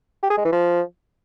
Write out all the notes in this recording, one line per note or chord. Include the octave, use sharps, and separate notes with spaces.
G4
G#4
G#3
E3
F3